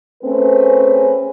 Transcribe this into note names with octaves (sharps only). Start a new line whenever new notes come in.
A3 C4 C#4 G#4 B4